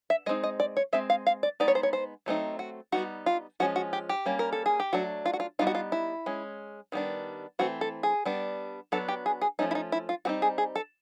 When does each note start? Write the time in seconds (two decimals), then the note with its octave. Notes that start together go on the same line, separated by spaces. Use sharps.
0.10 E5
0.26 G#3 C4 D#4 D#5
0.44 D#5
0.60 D5
0.77 C#5
0.93 G#3 C4 E5
1.10 F5
1.27 F5
1.43 D5
1.60 G#3 B3 D#4 D5
1.68 C#5
1.75 C5
1.83 C#5
1.93 C5
2.26 F#3 A3 C4 D#4
2.59 F#4
2.92 G3 B3 D#4 F#4
3.26 F4
3.60 F3 G#3 C#4 F#4
3.76 F#4
3.93 G4
4.09 G4
4.26 G3 A#3 C#4
4.39 A#4
4.52 A4
4.66 G#4
4.80 G4
4.93 F#3 A3 D4 F#4
5.26 F4
5.33 F#4
5.40 F4
5.59 G3 B3 D#4 F4
5.67 F#4
5.75 F4
5.92 E4
6.26 G#3 C#4
6.92 D#3 G3 B3 D4
7.59 E3 A3 C4 F#4
7.81 A4
8.03 G#4
8.25 G3 B3 D4
8.92 F#3 B3 D4 A4
9.08 G4
9.26 G#4
9.41 G#4
9.59 F3 A3 C#4 D#4
9.71 E4
9.75 D#4
9.92 E4
10.09 F4
10.25 G3 C4 D#4 F#4
10.42 G#4
10.58 G#4
10.76 A4